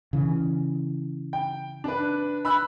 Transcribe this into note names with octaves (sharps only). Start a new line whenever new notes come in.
C#3 E3
G5
D4 B4
B5 E6 F#6